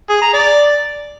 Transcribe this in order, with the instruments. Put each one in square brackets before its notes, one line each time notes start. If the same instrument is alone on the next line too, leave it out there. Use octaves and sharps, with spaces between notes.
[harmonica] G#4
A#5
D5